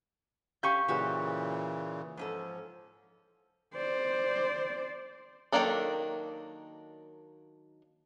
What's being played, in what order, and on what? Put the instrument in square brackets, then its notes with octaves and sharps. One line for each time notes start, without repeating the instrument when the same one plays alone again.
[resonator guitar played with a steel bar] C#4 G4 F5 [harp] C#6 G6
[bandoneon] A#2 C#3 E3 [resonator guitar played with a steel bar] F#4 G4
[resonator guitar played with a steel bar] G#2 C#4 A4 [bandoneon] F3
[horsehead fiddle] C5 D5
[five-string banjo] D#3 F#3 A#3 D4 A4